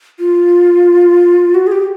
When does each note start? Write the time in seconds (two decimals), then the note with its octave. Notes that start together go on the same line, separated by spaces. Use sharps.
0.19 F4
1.55 F#4
1.67 G#4
1.72 G4